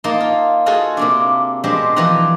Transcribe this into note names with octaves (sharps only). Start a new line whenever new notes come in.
A#3 D#4 A5 C6
F4
F4 F#4 G#4 A4 D#5
C3 A#3 D4
B2 G#3 C4 D4 G4
E3 F3 G4 A#4 F#5 A#5